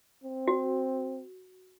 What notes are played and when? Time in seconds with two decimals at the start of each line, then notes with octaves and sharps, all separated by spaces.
0.24 C4
0.48 F#4